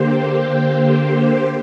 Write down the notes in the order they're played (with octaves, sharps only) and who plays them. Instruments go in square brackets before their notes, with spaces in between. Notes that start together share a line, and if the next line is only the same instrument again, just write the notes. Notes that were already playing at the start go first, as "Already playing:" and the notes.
Already playing: [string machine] D3 A#3 G4 C5